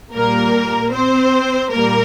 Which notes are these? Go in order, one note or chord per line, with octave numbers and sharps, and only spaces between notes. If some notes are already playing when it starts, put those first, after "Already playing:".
A#2 G3 A#3 A#4
C4 C5
A#2 G3 A#3 A#4